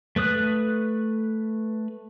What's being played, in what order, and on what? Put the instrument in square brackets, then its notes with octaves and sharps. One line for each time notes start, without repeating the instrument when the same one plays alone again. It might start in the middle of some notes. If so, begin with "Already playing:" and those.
[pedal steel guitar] A3 B4 D#6 F#6